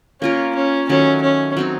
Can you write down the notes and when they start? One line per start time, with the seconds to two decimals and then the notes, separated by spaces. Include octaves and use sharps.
0.22 A#3 C#4 F4 A#4
0.56 C#4
0.89 D#3 F#3 A3 C#4
1.23 C#4
1.57 F#3 C4 D#4